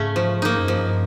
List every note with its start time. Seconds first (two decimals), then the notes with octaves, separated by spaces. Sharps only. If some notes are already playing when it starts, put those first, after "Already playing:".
Already playing: G#2 C#3 A3 C#4
0.16 F3
0.42 A#3 D#4
0.59 F#2
0.68 G2 F3